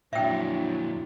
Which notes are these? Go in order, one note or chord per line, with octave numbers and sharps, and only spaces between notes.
F2 A#2 F#3 D4 E4 E5 G5